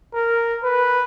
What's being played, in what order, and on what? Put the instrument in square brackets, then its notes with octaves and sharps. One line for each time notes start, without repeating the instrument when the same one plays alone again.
[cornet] A#4
B4